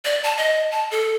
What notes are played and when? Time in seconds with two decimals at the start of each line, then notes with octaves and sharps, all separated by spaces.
0.05 D5
0.24 A5
0.38 D#5
0.71 A5
0.91 A4